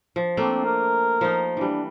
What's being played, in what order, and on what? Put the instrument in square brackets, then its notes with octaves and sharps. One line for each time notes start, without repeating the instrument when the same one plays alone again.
[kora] F3
[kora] A3 A#3 D4 [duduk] C4
[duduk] A#4
[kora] F3 D#4
[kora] E3 G3 [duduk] D4